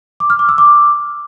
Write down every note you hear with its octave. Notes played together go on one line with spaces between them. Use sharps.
D6
F6
D6
E6
D6